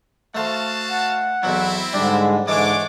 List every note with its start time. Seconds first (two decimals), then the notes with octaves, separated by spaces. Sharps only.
0.35 A3 F#4 C5 F5 A5
0.90 F#5
1.43 B1 E2 F#3 C4 E4
1.93 G#2 D3 G3 G#3 D4
2.47 G#2 D3 E3 G#3 D4 A4 C#5 D6